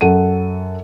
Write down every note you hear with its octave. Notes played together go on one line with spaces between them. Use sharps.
F#2 A4 F#5 D#7